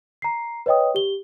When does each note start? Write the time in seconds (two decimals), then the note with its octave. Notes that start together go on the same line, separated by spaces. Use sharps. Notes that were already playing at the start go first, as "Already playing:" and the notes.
0.22 A#5 C7
0.66 B4 C#5 D#5 G5 D#6
0.95 G4 G7